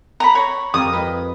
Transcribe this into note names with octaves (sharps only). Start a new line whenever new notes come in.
A#5 B5
C#5
F2 A#4 D#6
B4 D#5